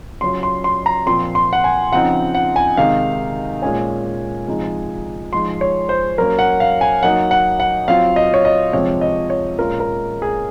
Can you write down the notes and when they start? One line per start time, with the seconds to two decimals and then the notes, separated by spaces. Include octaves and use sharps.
0.21 C#3 F#3 C#4 F4 C6
0.43 C6
0.64 C6
0.86 A#5
1.06 A#2 F3 C4 C6
1.35 C6
1.53 F#5
1.64 G#5
1.92 C#3 F3 C4 D#4 F#5
2.35 F#5
2.56 G#5
2.77 C3 D#3 G#3 D#4 F5
3.62 A#2 G#3 C#4 G#5
4.47 C3 F3 G#3 D#4
5.33 F3 G#3 D#4 C6
5.61 C#5
5.89 C5
6.18 F#3 A#3 C#4 A#4
6.39 F#5
6.60 F5
6.81 G#5
7.03 F#3 A#3 D#4 F#5
7.31 F#5
7.60 F#5
7.87 F#3 C4 F4 F5
8.16 D#5
8.34 C#5
8.45 D#5
8.73 C3 F3 G#3 C4 C#5
9.01 D#5
9.30 C#5
9.58 A#2 G#3 C#4 F4 A#4
9.80 A#4
10.22 G#4